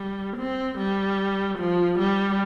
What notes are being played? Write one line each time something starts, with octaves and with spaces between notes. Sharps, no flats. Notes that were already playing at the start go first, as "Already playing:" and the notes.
Already playing: G3
C4
G3
F3
G3